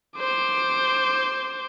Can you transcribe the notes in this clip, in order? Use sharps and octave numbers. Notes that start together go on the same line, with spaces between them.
C5 D6